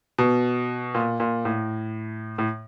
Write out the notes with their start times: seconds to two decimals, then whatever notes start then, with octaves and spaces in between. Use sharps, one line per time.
0.18 B2
0.95 A#2
1.20 A#2
1.45 A2
2.38 A2